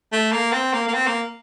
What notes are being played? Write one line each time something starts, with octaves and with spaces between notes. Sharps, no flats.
A3
A#3
C4
A#3
A#3
C4
A#3